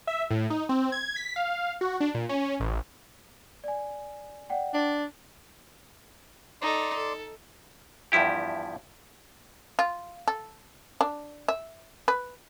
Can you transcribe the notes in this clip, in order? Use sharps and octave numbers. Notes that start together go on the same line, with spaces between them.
E5
A2
D#4
C4
G#6
B6
F5
F#4
D4
A#2
C#4
A1
D5 G#5
D5 F#5 G5
D4
D#4 A4 D5 C6
A4
E2 G2 F3 E4 G4
F4
A4
D4
E5
B4